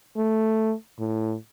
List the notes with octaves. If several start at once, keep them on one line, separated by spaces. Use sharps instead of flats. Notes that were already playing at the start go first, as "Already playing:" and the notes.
A3
A2